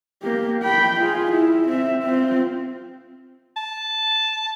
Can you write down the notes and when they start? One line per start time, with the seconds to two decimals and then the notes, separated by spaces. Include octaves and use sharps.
0.23 A#3 G4
0.62 G5 B5
1.00 F4 G#4
1.31 E4
1.68 C4 E5
2.03 C4 F4
3.56 A5